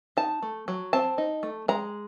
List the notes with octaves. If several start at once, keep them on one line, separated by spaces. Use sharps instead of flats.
D#4 A5
A3
F#3
C4 A5
D#4
A3
G#3 A#5